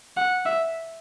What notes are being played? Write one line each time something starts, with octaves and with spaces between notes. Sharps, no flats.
F#5
E5